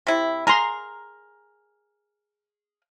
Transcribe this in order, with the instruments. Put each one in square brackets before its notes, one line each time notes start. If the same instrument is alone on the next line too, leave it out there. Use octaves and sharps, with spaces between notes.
[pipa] C3 E4
[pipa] G#4 A#4 [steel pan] A#5 C6